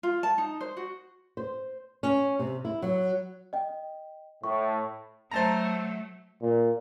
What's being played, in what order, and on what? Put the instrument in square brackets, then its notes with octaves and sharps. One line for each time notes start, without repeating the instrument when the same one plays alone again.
[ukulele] F4
A5
D#4
C5
F#4
[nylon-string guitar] C5
C#4
C3
E4
F#3
[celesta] D#5 G5
[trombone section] A2 [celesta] C#6
[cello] F#3 A3 [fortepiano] C5 A5 A#5
[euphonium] A#2